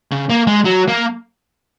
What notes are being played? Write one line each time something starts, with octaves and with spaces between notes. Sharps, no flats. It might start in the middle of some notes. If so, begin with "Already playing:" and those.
C#3
A#3
G#3
F#3
A#3